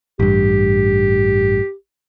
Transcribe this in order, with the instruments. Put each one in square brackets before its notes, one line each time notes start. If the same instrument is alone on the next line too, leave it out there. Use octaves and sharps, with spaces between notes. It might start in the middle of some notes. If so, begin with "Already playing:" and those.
[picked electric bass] A1 G2 [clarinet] G4